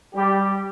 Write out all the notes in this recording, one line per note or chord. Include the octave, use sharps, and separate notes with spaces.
G3 G4